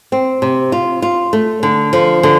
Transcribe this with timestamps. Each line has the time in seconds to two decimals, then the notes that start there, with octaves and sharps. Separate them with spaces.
0.12 C4
0.42 C3
0.72 F4
1.02 F4
1.33 A3
1.63 D3
1.93 F3
2.23 D3